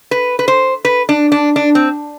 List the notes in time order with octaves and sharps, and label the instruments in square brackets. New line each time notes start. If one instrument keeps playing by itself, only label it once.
[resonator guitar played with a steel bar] B4
B4
C5
B4
D4
D4
D4
C4